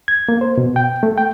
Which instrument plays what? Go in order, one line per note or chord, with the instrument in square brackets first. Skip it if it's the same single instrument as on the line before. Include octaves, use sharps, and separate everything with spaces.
[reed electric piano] G#6
A#3
C5
B2
G5
A3
G5